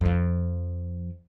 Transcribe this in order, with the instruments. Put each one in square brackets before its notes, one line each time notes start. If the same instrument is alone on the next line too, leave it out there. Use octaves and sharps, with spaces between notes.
[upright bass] F2 F3